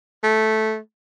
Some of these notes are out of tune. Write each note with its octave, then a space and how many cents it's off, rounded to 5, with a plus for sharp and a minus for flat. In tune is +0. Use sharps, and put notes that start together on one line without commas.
A3 -10